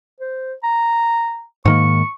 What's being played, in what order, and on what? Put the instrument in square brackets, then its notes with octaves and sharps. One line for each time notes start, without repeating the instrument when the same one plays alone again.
[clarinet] C5
A#5
[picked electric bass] G#2 D#3 A#3 [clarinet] C#6